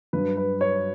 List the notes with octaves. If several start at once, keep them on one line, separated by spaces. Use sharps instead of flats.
G2 F#3 B4
B4
C#5